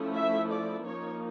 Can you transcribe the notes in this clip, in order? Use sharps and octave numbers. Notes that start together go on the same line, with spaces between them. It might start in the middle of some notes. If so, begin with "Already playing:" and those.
Already playing: F3 A3 C#4 E4
E5
D5
F3 A#3 D#4 C#5